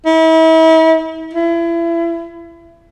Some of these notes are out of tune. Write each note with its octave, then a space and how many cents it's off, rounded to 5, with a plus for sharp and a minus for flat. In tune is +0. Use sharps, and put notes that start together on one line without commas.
E4 -40
E4 +30